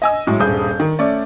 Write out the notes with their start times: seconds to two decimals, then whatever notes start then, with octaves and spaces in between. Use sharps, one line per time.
0.02 D#5 G#5 E6
0.27 A2 F#3 G#3
0.40 D#1 G2 G#4 D#6 G6
0.80 D#3
0.99 A3 C#4 D5